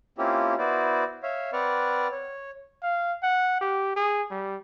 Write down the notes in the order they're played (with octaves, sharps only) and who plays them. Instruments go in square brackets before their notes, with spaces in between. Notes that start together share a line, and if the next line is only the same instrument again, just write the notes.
[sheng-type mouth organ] A#3 C4 C#4 E4 F4 G4
B3 E4 F#4 C5 D5
C#5 E5 F5
C4 B4 D5 F#5 C#6 F6
C#5
[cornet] F5
F#5
G4
G#4
G3